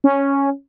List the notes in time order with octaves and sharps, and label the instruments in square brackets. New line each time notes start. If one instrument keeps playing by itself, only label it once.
[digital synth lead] C#4